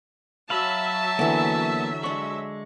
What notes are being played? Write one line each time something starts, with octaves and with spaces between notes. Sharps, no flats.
F#3 E5 F5 A5 B5
D3 E3 A#3 B3
G#3 D4 B5 C#6